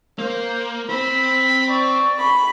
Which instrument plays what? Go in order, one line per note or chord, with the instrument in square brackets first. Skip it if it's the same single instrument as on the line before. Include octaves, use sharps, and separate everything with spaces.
[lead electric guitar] A#3 [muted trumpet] C5
[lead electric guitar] C4 C5 [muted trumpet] B5
[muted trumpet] D5 [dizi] C#6
[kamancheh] B5